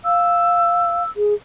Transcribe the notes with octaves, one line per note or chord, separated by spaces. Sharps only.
F5 E6
G#4